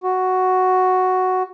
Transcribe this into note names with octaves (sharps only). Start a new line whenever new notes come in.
F#4